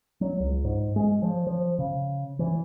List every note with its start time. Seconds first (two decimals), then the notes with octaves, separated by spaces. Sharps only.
0.21 F#3
0.40 C#2
0.64 G#2
0.96 G#3
1.22 F3
1.47 F3
1.79 C#3
2.39 E3